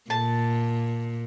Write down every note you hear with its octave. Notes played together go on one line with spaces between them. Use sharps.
A#2 A5